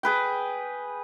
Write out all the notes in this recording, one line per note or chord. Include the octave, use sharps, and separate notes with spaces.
G#4 B4 G5